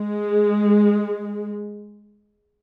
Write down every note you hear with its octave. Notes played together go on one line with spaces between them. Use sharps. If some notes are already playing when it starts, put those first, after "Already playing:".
Already playing: G#3